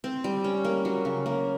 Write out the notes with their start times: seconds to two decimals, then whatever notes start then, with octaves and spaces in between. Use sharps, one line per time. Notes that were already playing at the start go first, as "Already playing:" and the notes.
0.04 C4
0.24 G3
0.44 C#4
0.65 A#3
0.85 F#3
1.05 C#3
1.26 A#3